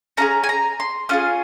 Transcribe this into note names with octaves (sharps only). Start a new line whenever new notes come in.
C#4 F4 G#4 A#5
G#5
A#5
C6
C#4 F4 G#4 F6